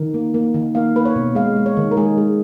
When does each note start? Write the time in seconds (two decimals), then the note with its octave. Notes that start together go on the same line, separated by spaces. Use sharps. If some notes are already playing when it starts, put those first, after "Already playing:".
Already playing: D#3 A#4
0.14 A#3
0.34 A#3
0.54 D#3
0.75 A#3 F5
0.96 A#3 B4
1.05 C#5
1.16 B2
1.35 G#3 F5
1.56 G#3
1.66 C#5
1.77 D#3
1.91 A#4
1.97 G#3 G#4
2.17 G#3